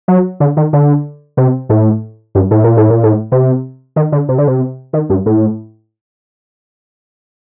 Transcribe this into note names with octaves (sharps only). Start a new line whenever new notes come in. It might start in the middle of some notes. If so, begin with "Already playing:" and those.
F#3
D3
D#3
D3
C3
A2
G2
A2
A#2
A2
A#2
A2
C3
D#3
D3
C3
D3
C3
D#3
G2
A2